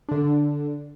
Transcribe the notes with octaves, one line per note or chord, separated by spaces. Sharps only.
D3 D4